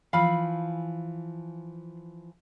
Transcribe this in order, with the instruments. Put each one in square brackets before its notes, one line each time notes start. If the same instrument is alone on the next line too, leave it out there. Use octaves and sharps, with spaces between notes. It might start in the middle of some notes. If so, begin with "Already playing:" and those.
[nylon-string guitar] E3 F3 [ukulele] F5 B5